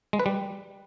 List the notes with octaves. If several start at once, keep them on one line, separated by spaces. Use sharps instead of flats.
G#3
B4
G3